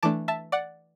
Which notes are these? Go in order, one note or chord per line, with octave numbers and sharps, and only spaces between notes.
E3 A3 D4 A5 D6
E5 A5
D5 F#5